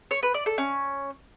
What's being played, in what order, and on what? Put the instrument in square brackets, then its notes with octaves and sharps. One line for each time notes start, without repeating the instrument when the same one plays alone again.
[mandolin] C#5
B4
D5
A4
C#4